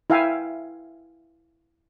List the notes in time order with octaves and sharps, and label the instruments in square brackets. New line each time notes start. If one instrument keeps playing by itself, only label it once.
[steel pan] E4 E5 F5 G5 G#5